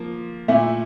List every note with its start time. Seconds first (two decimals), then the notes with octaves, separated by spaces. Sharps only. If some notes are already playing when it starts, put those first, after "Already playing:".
Already playing: F3 A#3
0.48 A#2 A3 E4